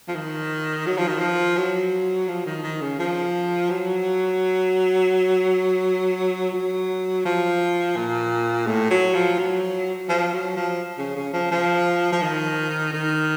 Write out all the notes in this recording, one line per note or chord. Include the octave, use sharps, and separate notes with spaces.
F3
D#3
F#3
F3
D#3
F3
F#3
F3
D#3
D#3
C#3
F3
F#3
F#3
F3
A#2
A2
F#3
F3
F#3
F3
F#3
F3
C#3
C#3
F3
F3
F3
D#3
D#3